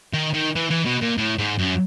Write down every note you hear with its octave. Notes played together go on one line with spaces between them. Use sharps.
D#3
D#3
E3
E3
B2
A#2
A2
G#2
F#2